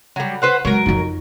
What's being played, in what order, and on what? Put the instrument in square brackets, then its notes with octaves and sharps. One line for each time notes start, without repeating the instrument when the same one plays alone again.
[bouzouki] F#3 G3
B4 C5 F#5
[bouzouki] F#3 A#4 [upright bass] G#3
[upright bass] F2 D#4